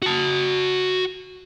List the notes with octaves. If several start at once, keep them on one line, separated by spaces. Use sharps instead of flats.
F#4 A5